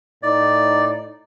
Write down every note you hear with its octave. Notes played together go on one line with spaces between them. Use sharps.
A2 D#4 D5